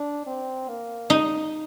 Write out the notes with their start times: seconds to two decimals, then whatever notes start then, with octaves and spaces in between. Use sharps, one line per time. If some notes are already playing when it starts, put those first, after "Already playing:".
Already playing: D4
0.27 C4
0.69 A#3
1.10 D#4